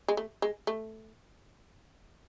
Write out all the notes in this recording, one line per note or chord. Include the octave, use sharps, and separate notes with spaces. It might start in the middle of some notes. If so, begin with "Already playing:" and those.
G#3
A3
G#3
A3